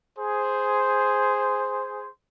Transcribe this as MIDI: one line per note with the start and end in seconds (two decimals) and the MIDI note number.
0.19 2.09 68
0.19 2.09 72